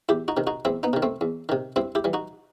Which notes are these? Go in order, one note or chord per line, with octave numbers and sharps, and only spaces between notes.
E2 E4 G4
D#4 F#4
C3 D#3
D#4 F#4
E2 C4 E4
B3 D#4
C3 D#3
A3 C4
E2
C3 D#3
G2 C4 E4
E4 G4
E3 G3
D#4 F#4